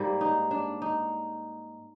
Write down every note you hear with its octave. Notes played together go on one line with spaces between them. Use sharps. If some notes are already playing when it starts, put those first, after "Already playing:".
Already playing: G#2 G3 A#3
D#4
D4
D#4